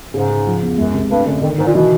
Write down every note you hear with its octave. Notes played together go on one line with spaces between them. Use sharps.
G#2 C#3
C#3
F3
E2
C#2 F#2
C3
G2 A3
F#2 D3
F2 D#3
G#2 D#3
A#2
B2 E3